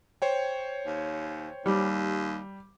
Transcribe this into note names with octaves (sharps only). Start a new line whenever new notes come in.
C5 C#5 G5
D#2
D#2 G3